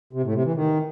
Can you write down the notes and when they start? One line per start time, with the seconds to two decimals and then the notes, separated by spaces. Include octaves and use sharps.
0.13 C3
0.24 A2
0.34 C3
0.45 E3
0.55 D#3